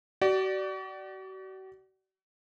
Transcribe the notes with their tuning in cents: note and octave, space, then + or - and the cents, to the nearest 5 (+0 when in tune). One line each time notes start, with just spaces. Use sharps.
F#4 +40 D5 +0